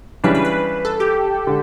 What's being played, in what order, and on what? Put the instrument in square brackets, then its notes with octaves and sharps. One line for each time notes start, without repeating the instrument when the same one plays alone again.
[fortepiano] C#3 E3 G3 D4 [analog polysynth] B4
[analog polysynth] B4
B4
A4
G4
[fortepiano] D3